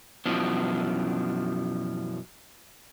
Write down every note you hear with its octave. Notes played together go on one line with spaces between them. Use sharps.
F#2 B2 E3 F3 D4